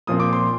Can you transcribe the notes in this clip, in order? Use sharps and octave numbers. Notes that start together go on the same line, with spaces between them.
A#2 F3 C4 D#6
D6
C6